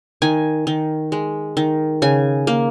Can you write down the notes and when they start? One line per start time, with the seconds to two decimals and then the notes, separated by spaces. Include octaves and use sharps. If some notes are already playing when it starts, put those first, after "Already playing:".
0.22 D#3 G#5
0.67 D#3
1.12 G#3
1.57 D#3
2.02 C#3 G#5
2.47 A#3